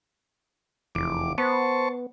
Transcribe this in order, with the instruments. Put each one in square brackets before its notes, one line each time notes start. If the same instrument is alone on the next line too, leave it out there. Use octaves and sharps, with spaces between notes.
[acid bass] F1 [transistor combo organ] E2 D6
[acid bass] B3 [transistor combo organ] C5 A5 C#6